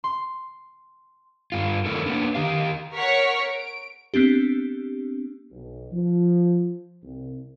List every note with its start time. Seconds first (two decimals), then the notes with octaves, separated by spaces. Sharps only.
0.04 C6
1.52 G2 F4
1.86 D#3 A3 E4 A4 A#4
2.06 A#3 B3 D4
2.35 D#3 G4 F5
2.95 A#4 C#5 F#5 C#6 F6 B6
3.54 D7
4.14 B3 C4 D4 G4
5.51 B1
5.92 F3
7.03 C2